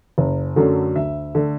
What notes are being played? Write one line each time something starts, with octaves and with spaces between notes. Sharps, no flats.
F#1
F#2 D3 F#3 A3
D2 E5
D3 A3